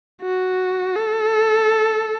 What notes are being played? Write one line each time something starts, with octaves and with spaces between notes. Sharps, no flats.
F#4
A4